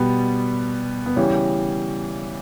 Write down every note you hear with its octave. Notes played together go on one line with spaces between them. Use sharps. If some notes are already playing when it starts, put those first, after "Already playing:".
Already playing: B2 G3 B3
B3
C#3 E3 G3 C#4